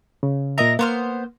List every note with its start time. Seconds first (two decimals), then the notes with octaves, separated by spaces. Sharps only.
0.23 C#3
0.58 A#2 A#4 D#5 E5 A#5
0.79 A#3 B3 C5 F6